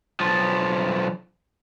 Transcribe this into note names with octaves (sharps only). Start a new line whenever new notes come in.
B1 F3